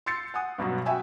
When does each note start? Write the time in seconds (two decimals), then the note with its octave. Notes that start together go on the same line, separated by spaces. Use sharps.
0.06 C6 E6 G6 A6 C7 C#7
0.34 F#5 G#5 D#6
0.58 G2 B2 F#3 F#4
0.85 F#4 E5 G5 G#5 B5 E6